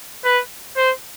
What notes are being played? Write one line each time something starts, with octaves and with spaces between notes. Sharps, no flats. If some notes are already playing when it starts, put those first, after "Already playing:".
B4
C5